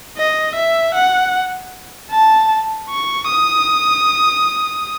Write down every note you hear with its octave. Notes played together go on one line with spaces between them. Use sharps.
D#5
E5
F#5
A5
C#6
D#6